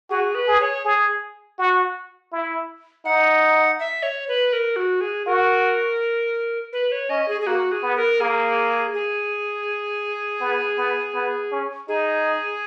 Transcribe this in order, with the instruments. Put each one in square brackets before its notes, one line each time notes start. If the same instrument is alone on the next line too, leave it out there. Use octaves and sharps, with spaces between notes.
[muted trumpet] F#4 [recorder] G#4
[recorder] B4
[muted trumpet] G#4
[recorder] C#5
[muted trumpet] G#4
F#4
E4
[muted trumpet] D#4 [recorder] F#5
[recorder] E5
C#5
B4
A#4
F#4
G#4
[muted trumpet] F#4 [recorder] A#4
[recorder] B4
C#5
[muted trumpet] C#4 [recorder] D#5
[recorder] G#4
G#4
[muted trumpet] A#3 [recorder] F#4
[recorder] G#4
[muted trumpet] B3
[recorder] A#4
[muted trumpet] A#3 [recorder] G#4
[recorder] G#4
[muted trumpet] B3
B3
B3
C#4
[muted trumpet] D#4 [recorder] G#4